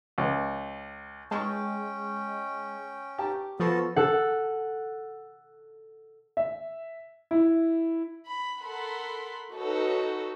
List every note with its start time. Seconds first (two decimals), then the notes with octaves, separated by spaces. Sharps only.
0.18 C#2
1.31 G#3 C#4 G5 A5 C#6
3.18 G4 A5 A#5
3.60 F3 B3 F#4 A4
3.96 A4 F#5
6.37 E5
7.31 E4
8.27 B5
8.61 A4 A#4 F#5 B5 C6
9.54 D#4 F#4 A4 B4 C#5